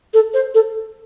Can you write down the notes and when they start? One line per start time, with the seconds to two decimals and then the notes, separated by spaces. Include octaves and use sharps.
0.14 A4
0.34 C5
0.55 A4